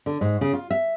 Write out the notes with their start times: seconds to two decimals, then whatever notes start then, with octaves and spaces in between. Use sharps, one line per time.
0.06 D3
0.21 G#2
0.41 C#3
0.53 F4
0.70 E5